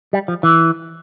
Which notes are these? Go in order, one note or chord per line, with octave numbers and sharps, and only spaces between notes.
G3
F3
E3